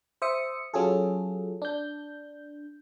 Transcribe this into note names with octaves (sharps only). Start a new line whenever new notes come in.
C5 E5 D#6 C#7
F#3 C#4 F4 G#4 A4
D4 G6